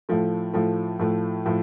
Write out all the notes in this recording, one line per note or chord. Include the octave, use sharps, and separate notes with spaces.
A2 F3 A3
A2 F3 A3
A2 F3 A3
A2 F3 A3